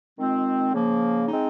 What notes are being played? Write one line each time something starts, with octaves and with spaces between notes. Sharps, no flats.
D#3 G#3 C4 F4
C#3 F3 A#3
G#3 C4 D#4